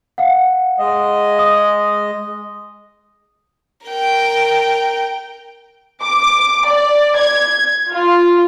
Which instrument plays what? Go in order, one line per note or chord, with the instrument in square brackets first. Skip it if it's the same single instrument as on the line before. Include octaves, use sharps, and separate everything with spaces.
[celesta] F5 F#5
[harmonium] G#3 D#5
[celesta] D#6
[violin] A#4 G5
[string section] D6
D5
G#6
F4